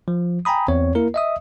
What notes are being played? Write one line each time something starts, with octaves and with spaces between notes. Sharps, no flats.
F3
G5 G#5 A#5 B5 D#6
E2 C4 C#5
A#3 E4 A#4
D#5 E5 D#6